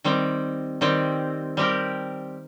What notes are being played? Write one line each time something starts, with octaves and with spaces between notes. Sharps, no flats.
D#3 G3 C4
D#3 G3 C4
G3 C4 G4 A#4